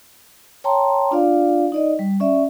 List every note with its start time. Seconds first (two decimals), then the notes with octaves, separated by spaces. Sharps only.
0.64 C#5 G5 A5 A#5 C6
1.11 D4 F4 D5 F5
1.72 D#4 D5 D#5
1.99 G3
2.20 C#4 D5 E5